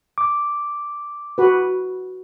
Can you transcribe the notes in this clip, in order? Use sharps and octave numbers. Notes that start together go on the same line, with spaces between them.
D6
F#4 B4